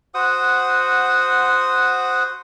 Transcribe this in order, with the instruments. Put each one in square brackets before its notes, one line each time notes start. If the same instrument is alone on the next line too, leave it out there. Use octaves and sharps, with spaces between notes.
[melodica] F#4 C5 F#5 D#6